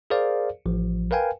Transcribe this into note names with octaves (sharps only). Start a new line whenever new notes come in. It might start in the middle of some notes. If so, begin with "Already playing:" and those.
G#4 A#4 C5 D5 F5
A1 F3
A#4 B4 F5 G5 G#5